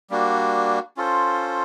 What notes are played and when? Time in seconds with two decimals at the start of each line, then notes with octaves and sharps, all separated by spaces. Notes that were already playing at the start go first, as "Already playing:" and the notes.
0.10 G3 A#3 D4 F#4
0.97 C#4 F4 A4 C5